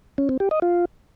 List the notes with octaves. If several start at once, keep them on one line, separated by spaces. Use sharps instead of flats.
C#4
C4
G4
D#5
F4